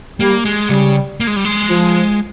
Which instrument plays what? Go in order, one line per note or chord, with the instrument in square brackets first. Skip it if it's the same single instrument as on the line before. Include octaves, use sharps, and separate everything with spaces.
[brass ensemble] G3 [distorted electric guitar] A#3
[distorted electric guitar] G#3
[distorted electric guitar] C#3 [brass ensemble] G3
[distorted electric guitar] A#3
G#3
G3
G#3
[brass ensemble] F3